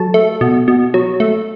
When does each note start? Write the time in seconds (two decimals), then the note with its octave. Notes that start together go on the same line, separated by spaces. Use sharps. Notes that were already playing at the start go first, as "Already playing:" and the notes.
Already playing: F#3 A4 A5
0.14 A3
0.41 B2
0.68 B2
0.94 F#3
1.20 A3